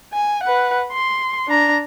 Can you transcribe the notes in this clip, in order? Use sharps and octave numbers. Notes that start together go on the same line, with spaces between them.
G#5
B4 F#5
C6
D4 A#5